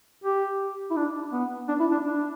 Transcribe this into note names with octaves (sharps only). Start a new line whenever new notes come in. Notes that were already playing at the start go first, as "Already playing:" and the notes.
G4
E4
D4
B3
D4
E4
D4
D4